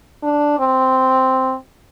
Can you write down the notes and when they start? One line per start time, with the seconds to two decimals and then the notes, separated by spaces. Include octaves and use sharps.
0.23 D4
0.59 C4